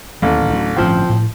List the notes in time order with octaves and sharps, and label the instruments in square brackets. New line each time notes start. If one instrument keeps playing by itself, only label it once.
[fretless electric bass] D1 D#2 [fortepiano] A1
[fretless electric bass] D2 F#3
[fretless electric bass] G1 A2 C#4 [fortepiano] F3 C4
[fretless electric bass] A2